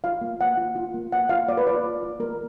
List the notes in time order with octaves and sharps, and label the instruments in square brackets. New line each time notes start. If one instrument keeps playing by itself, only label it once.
[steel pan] F4 F5
A#3
A#3 F#5
F4
F4
A#3
A#3 F#5
F4 F5
A#3 D5
B4
F4 D5
A#3
F4
A#3 A#4